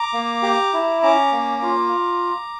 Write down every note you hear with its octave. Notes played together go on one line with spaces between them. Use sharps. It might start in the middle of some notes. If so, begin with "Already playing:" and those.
Already playing: A#5 D6
A#3
G4
E4
C#4 A#5 D6
A#3
F4